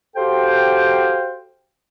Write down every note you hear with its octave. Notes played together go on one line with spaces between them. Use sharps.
F#4 G4 A4 C5 F5 G5